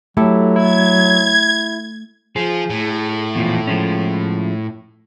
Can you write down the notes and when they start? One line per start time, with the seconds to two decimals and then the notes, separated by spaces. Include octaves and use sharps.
0.17 F#3 A3 E4 G4 A4
0.56 E4 G#6
2.36 F3 G#4
2.70 A2
3.35 E2 A#2 F3
3.67 F3 G#3 C#4